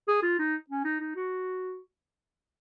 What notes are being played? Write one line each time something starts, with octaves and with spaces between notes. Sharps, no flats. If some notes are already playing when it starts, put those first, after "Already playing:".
G#4
F4
D#4
C#4
D#4
D#4
F#4